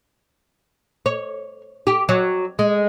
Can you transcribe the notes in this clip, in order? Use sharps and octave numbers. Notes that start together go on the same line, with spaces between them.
C#5
G4
F#3
G#3